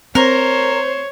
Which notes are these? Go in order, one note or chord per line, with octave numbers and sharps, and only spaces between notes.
C4 A#4 C5 C#5